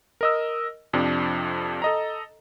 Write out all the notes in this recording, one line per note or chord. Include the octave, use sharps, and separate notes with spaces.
A#4 D#5 E6
F2 C3 F3 D4
A4 D#5 A#5